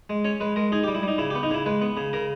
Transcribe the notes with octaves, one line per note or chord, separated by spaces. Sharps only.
G#3
C#4 C#5
G#3 B4
G#3 A#4
D#4 G#4
G4
G3
E4
G3 D#4
C#3 E4
G4
B3
D#4
C#3 E4
G#3 B4
B3
C#3
C#3 A#4